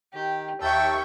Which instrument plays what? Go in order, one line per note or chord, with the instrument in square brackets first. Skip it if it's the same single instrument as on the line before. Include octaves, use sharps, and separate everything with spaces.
[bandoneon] D#3 [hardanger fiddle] G4
[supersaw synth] D#2 E5 C#6 [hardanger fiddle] G5 [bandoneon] A5 E6